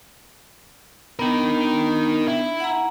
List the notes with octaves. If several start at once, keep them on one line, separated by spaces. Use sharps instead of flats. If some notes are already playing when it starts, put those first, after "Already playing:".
B3 D4 D#4 A#4
E4
F#5 A#5